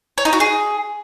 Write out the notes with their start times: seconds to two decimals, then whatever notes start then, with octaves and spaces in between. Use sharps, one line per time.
0.18 C#5
0.25 D#4
0.33 F#4
0.40 G#4